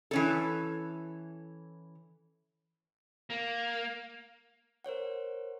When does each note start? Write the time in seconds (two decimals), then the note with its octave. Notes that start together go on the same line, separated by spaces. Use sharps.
0.11 E3 C#4 A4
3.30 A#3
4.84 A#4 C5 C#5 F#5